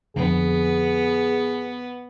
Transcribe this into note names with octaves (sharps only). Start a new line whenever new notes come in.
F2 D3 B3 G#4